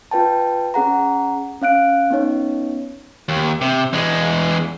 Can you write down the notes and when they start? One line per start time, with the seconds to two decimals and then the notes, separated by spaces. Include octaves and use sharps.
0.11 F4 B4 G5 A5
0.74 C#4 G#4 F#5 A#5
1.62 C#4 F5 F#6 D7
2.10 B3 C#4 D#4 C#5
3.29 D#2
3.61 C3
3.93 E2 G#3